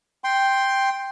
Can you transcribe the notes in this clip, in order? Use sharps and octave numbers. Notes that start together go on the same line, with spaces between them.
G5 C6